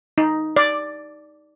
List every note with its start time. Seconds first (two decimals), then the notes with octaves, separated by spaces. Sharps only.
0.18 D#4
0.56 D5